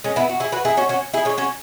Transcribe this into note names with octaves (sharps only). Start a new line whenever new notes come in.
G#3 C#4
B3 E4
F#4
E4 G#4
F#4 B4
E4 G#4
C#4 F#4
C#4 F#4
E4 G#4
G#3 C#4
C#4 F#4